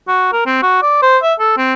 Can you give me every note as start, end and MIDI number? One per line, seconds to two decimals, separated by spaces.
0.08 0.30 66
0.32 0.45 70
0.46 0.62 60
0.62 0.82 66
0.82 1.00 74
1.02 1.18 72
1.23 1.34 76
1.39 1.56 69
1.57 1.74 60